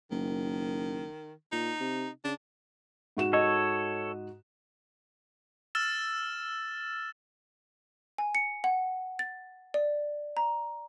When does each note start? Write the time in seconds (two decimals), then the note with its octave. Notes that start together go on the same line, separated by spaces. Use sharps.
0.11 F#1 D#3
1.52 A#2 D#4
1.80 C3
2.24 C#3 D4
3.17 G#2 F#4 E7
3.33 A4 C#5 D#5
5.75 E6 F6 A6 E7
8.18 G#5
8.35 C#7
8.64 F#5
9.19 A6
9.74 D5
10.37 A#5